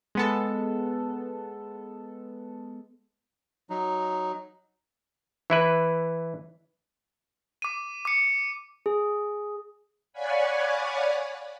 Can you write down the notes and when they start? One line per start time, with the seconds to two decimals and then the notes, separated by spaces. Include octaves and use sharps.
0.15 G#3 B3 A4
3.70 F#3 D#4
5.50 E3 E4 B4
7.62 D6 D#7
8.05 D6 C#7
8.86 G#4
10.13 C#5 D5 F5 F#5 G#5 B5